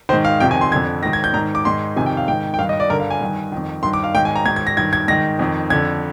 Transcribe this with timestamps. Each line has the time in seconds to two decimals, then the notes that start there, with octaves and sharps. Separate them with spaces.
0.09 G#2 D#3 C5
0.25 F5
0.40 F2 C3 D#3 G5
0.51 G#5
0.61 C6
0.71 F2 D3 G#6
1.03 G#2 D#3 A#6
1.13 G#6
1.24 G6
1.34 G#2 D#3 A#5
1.55 D6
1.65 G#2 D#3 C6
1.96 F2 C3 D#3 G#5
2.06 G5
2.17 F5
2.28 G#2 D#3 G5
2.54 G5
2.59 G2 D#3 F5
2.69 D#5
2.80 D5
2.90 G2 D3 A#4
3.00 F5
3.10 G#5
3.21 G2 D#3
3.52 F2 D#3
3.83 G2 D#3 C6
3.93 D6
4.04 F5
4.14 G#2 D#3 G5
4.25 G#5
4.36 A#5
4.46 G#2 D#3 G#6
4.56 G#6
4.67 A#6
4.77 G2 D#3 G#6
4.93 G#6
5.08 G#2 D#3 A#6
5.39 F2 D#3
5.70 F2 D3 G#6